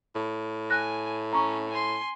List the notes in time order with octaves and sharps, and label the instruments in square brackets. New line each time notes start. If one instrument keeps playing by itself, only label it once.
[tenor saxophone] A2
[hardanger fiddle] G#5 [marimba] F#6 A#6
[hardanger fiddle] C#4 [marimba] A#5 C#6
[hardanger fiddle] G#5 C6